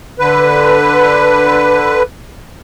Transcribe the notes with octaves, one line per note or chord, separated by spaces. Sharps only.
D3 B4